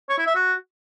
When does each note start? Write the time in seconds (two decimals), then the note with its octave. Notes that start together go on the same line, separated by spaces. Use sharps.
0.09 C#5
0.18 E4
0.27 E5
0.35 F#4